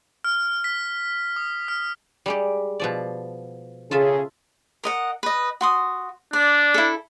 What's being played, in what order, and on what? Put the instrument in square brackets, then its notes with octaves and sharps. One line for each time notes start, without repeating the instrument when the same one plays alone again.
[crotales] F6
B6
D#6
F6
[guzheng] G3 G#3 G4
B2 F3 D5
[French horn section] C#3 G#4 [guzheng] F4 A4 E5
[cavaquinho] A#4 D#5 F#5
B4 D#5
F#4 C6 D#6
[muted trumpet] D4 [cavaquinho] D5
[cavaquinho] E4 A4